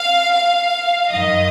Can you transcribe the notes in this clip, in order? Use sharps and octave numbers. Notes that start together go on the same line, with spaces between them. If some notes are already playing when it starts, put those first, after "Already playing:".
Already playing: F5
F5
F#2 D#3 D#5